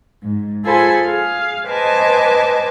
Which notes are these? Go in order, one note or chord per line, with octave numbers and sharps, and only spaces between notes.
G#2
F4 G#4 A4 C5 G#5 B5
G#4 F5
B4 C5 D#5 G#5 A5 D6